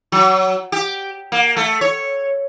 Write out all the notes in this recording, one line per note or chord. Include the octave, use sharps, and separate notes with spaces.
F#3
G4
A#3
A3
C#5